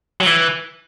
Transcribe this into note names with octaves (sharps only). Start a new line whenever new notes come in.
F#3
E3